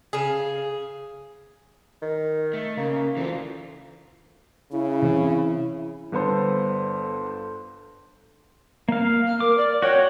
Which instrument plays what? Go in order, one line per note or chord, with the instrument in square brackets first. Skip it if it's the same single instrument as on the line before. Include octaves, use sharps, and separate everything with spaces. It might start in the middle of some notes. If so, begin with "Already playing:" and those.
[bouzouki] C#3 G#4
[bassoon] D#3
[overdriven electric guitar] A3
[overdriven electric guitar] C#3 [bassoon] A#3
[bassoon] D2 [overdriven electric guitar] E3 F4
[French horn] C#3 [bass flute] E4
[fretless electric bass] C3 E3 C4
[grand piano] G1 B3 A4 C5
[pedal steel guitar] A#3 F5
[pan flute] F6
[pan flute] A#4 [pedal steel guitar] D6
[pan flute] D5
[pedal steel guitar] F#4 F#5 G5 [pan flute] C#5